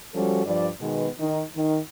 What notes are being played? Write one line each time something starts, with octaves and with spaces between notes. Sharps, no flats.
F3 G3 C#4 F#4 A4
G2 F3 D5
B2 D#3 G#3 B3
D#3 D#4
D#3